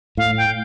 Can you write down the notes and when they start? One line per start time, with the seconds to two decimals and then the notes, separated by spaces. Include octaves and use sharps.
0.17 A2 F5
0.37 G5